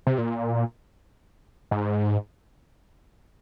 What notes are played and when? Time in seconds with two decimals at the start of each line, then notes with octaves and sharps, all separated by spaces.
0.07 C3
0.18 A#2
1.71 G#2